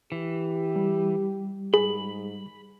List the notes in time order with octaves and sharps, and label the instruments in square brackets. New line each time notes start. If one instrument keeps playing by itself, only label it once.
[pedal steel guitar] E3 [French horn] G4
[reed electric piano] G3
[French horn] G#2 [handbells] G#4 [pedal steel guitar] B5